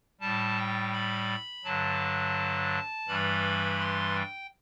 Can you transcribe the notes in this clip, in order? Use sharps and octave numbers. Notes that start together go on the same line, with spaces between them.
A2 G3 A5
G5
B5
G2 D3 F#3 A5
G2 E3 G3 B5
C6
G5